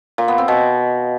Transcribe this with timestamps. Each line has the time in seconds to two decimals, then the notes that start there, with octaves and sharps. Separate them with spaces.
0.18 A#2
0.28 B3
0.38 C4
0.48 B2